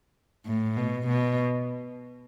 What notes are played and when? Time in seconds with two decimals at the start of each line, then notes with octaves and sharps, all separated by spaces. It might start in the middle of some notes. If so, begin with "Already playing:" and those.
0.46 A2
0.77 B2
1.07 B2